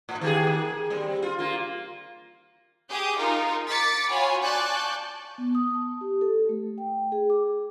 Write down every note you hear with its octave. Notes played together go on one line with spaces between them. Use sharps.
A2
D#3 G4 G#4
A#3
G3 C4
F4
A#3 F4
G4 G#4 D#6 G6
D#4 F4 A#4
D6 A6 B6 C#7
F4 F#4 C#5 G#5 B5
D5 G#5 A5 C#6 F#6 G6
B3
D#6
A5
G4
A4
A3
G5
G#4
D6